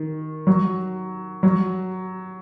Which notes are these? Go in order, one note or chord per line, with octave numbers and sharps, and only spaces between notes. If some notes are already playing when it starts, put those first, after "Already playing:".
Already playing: D#3
F#3
F#3